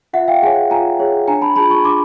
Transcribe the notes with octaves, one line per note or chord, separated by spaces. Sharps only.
F4 E5 F#5
F5 G5
G#4 C#5 F#5 G#5
F4 G#5 A#5
G#4 C#5
D4 G#5 A#5
A5 B5
F4 G#4 A5 B5
B5 C#6
D4 C6 D6